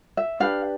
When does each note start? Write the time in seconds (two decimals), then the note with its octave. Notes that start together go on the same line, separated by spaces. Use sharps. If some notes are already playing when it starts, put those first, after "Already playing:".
0.17 E5
0.40 D4 G4 B4 F5